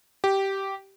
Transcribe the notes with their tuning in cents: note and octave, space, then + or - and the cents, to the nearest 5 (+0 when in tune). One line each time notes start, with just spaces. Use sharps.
G4 -10